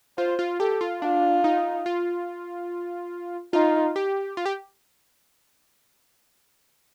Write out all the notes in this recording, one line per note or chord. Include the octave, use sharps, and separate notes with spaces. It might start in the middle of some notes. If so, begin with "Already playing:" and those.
F4 C5
F4
G4 A4
F4
D4 F4
D#4
F4
D#4 F4
G4
F4
G4